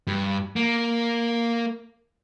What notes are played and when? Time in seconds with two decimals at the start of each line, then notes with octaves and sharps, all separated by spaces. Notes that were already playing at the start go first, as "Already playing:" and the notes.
0.07 G2
0.56 A#3